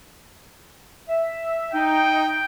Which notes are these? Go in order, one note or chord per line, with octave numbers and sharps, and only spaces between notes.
E5
D#4 G5